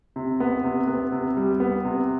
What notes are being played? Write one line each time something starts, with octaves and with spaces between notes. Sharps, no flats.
C3
B3
C3
B3
C3
G3
B3
C3